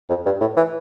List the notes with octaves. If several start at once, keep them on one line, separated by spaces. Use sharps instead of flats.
F2
G2
A2
E3